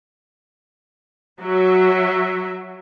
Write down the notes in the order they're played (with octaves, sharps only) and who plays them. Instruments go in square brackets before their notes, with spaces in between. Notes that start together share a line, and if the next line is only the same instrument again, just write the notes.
[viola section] F#3 F#4 E5